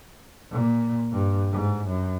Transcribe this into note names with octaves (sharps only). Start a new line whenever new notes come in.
A#2
G2
G#2
F#2